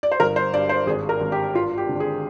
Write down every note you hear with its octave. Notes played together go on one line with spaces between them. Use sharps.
D5
C5
G1 A#4
C5
G2 D5
C5
G#1 G#4
A#4
G#1
G4
G2 F4
G4
D3
G#4